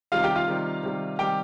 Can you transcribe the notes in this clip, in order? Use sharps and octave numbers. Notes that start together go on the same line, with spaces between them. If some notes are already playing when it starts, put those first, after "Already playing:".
C3 D#3 G3 F4 F5
G4 G5
F4 F5
C3 D#3 G3
C3 D#3 G3
C3 D#3 G3 G4 G5